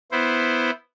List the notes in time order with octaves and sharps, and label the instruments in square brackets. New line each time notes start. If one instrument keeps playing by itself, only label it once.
[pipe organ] B3 E4 C5